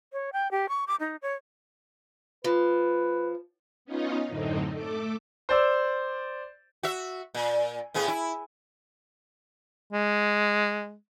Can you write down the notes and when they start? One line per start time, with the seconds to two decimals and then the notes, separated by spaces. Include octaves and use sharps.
0.13 C#5
0.33 G5
0.51 G4
0.69 C#6
0.87 D6
1.00 D#4
1.22 C#5
2.44 F3 B4
3.85 B3 C#4 D#4 F4 D#5
4.28 F#2 A2 D3 C4 D#4
4.72 A3 A4 D6
5.49 C5 D5 E6
6.83 F#4 E5
7.34 A#2
7.94 A2 B3 G#4
8.08 E4
9.93 G#3